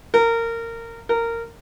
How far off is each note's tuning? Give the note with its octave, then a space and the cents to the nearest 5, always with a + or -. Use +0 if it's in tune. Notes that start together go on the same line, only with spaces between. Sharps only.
A#4 -20
A#4 -15